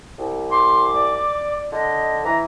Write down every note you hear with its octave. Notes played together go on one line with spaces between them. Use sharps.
C2
C6 D6
D5
D3 D#5
E3 A#5